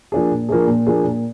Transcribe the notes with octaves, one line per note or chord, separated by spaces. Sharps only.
F3 A#3 D4 G#4
A#2
F3 A#3 D4 G#4
A#2
F3 A#3 D4 G#4
A#2